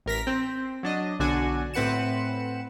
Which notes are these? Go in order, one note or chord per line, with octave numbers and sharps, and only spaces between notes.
A1 A#4 A#6 B6
C4
F#3 D4 D#5
B1 D3 D4 F#4 G#5
A2 C4 B4 F#5 C#7 E7